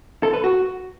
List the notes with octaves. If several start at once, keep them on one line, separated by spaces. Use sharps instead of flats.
A4
B4
F#4